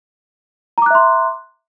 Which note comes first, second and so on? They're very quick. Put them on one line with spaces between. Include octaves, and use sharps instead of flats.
A#5 D6 F#6 E5 C6